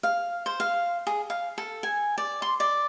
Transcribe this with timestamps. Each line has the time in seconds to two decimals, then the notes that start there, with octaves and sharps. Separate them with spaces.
0.03 F5
0.46 C5
0.60 F5
1.07 G#4
1.30 F5
1.58 A4
1.83 G#5
2.18 D5
2.42 C6
2.60 D5